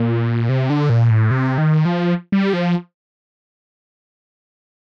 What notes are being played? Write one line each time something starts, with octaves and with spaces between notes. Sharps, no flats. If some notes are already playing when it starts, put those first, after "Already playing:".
Already playing: A#2
C3
D3
A#2
A2
C3
D#3
F3
G3
F3